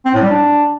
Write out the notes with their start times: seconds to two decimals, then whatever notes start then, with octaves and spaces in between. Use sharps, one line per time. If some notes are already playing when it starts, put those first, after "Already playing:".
0.05 C4
0.14 A2
0.22 G3
0.30 D4